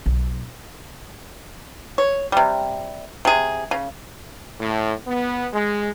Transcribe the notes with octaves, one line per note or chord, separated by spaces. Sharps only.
B1
C#5
C3 G3
C3 G#4
C#3
A2
B3
G#3